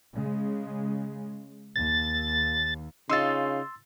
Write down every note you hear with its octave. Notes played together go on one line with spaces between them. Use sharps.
C#3 G#3
D#2 A6
C#3 D#4 F4 C6 E6 A6